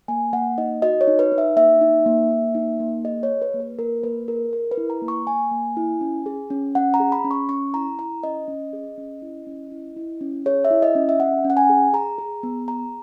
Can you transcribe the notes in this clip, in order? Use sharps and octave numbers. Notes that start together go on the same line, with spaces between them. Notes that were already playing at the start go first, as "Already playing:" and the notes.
A#3 G#5
A#3 F#5
D#4 D#5
F#4 D#5
C#5
D#4
B4
D#4
E5
A#3 E5
D#4
A#3
A#3
D#4
A#3
G#4 D#5
C#5
G#4
B4
A#3
B4
A#3 A#4
A#3 B4
G#4 A#4
G#4 A#4
B4
E4
A#5
A#3
C#6
A#3 G#5
A#3
E4
C#4
G#4
C#4
C#4 F#5
A#5
G#4
B5
C#4
C#6
C#4 C#6
E4 A#5
E4 A#5
C#4 D#5
C#4
G#4
C#4
E4
C#4
E4
E4
C#4
G#4 C#5
E5
E4
D#5
C#4
E5
C#4 F#5
C#4
F#5
G#5
G#4
G#4 A#5
G#4
B3
G#4 A#5